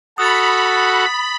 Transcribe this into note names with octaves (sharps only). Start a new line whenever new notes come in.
F#4 A4 F#5 B5 D#6 A6